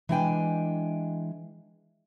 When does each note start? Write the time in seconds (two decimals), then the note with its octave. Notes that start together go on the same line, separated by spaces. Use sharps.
0.09 E3 G#3 D4 D5 G5 G#5